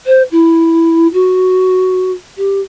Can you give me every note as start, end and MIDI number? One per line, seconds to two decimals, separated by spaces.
0.06 0.23 72
0.32 1.08 64
1.13 2.11 66
2.37 2.60 67